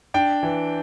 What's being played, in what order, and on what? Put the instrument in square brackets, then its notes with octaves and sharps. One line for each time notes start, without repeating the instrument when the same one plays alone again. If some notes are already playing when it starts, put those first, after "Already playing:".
[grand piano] D4 G5
E3